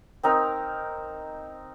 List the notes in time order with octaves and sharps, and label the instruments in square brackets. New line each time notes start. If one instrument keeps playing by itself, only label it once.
[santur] C4 D#4 A#4